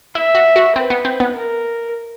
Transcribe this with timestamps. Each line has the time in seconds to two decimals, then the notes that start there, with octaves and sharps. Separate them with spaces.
0.15 E4 E5
0.35 F#4
0.56 F#4
0.76 C4 B4
0.90 B3
1.05 C4
1.20 B3
1.35 A#4